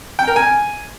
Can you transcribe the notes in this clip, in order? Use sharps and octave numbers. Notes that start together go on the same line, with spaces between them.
G5
A#4
G#5